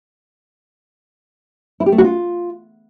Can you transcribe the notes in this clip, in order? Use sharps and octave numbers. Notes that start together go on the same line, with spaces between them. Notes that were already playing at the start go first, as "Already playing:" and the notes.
E4
G4
A3
F#4
F4